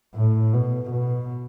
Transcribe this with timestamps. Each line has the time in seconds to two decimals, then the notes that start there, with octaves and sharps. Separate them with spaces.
0.15 A2
0.54 B2
0.91 B2